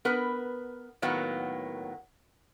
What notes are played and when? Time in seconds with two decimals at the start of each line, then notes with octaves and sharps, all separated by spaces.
0.05 B3 A#4 B4
1.02 A2 D#3 F#3 A#3 B3